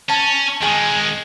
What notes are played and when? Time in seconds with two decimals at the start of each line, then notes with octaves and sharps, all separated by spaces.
0.09 C#4 A5
0.62 D#3 G#3 G#4